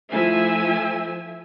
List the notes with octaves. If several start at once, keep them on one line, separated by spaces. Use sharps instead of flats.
F3 A3 E4 E5 G#5